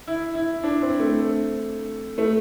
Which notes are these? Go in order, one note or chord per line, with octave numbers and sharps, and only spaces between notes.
E4
E4
D4
C4
A3
A3